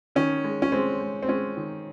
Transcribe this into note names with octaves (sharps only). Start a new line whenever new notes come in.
D#3 C#4
G#3
C#4
G#3 C4
G#3
C4
G#3 C#4
D#3